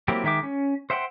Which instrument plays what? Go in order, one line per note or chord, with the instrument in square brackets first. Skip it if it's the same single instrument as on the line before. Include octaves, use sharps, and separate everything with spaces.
[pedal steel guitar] F#3 A#3 C4 E4 G4
D#3 G#3 E5 G5 D6
C#4
C5 E5 F#5 G5 C6